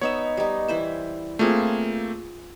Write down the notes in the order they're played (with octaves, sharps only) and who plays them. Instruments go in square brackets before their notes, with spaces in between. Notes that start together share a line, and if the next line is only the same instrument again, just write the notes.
[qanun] B3 D#4 E5 [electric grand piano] C#5
[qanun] G3 D#4
E3 E4 C5
[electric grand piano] A3 A#3 C4 [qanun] F4 G#4